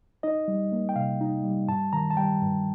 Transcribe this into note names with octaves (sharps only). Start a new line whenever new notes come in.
D#4 D#5
G3
A#3
G5
C3 F5
D#4
G3
G2 A5
D#3 A#5
A5
G3 G5
G2